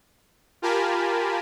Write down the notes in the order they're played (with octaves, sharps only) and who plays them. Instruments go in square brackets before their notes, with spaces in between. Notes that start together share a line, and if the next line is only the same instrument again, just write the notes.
[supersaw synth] F4 G4 A#4 G#5 A5 B5